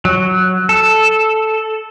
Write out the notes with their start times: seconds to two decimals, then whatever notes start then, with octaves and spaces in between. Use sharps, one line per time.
0.05 F#3
0.69 A4